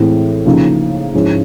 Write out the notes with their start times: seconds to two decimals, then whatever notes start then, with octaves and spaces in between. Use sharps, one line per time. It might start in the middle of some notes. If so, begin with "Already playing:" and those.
Already playing: A2 E3 G#3 C4
0.45 C#3 F3 A#3 D#4
1.14 G#2 F3 G#3 C#4 E4